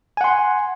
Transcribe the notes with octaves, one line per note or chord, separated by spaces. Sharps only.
F#5 G#5 C6